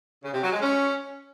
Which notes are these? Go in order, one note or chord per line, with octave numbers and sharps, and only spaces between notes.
C#3
C3
F#3
G#3
C#4